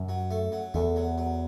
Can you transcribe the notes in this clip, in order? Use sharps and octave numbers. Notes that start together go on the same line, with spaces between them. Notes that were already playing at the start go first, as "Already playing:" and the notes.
Already playing: F#2
F#3
A3
F#3
E2 A3
F#3
F#3